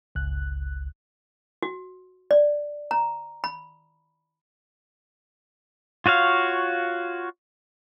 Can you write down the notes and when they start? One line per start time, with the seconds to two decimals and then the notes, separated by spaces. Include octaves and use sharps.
0.15 G1 C#2 F#6
1.63 F#4
2.31 D5
2.91 A#5
3.44 B5
6.06 F4 F#4 C#5 F5